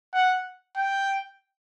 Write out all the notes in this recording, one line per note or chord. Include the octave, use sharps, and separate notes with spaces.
F#5
G5